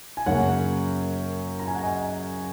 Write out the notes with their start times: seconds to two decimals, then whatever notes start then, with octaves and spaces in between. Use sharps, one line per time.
0.17 G#5
0.26 F#2 C#3 A#3 C#5 F#5
1.59 A#5
1.67 G#5
1.75 F#5
1.83 D#5 G#5